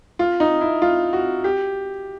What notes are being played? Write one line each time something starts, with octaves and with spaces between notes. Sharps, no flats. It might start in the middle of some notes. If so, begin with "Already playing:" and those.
F4
D#4
E4
F4
F#4
G4